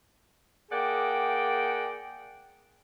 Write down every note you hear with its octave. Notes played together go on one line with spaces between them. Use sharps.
A#3 G#4 D5 F#5 G5